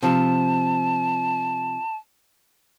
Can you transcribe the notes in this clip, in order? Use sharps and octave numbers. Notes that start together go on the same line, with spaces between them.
C3 F3 A5